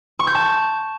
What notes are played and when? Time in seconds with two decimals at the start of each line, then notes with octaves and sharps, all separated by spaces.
0.19 C#6
0.27 G6
0.35 A5